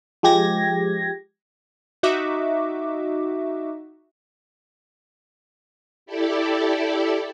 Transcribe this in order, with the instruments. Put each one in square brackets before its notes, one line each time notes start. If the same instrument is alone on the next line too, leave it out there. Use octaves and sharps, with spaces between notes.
[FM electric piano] F3 G#3 G4 G#6 A#6
[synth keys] D#4 F#4 D#5 E5 D6
[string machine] E4 G4 A4 D5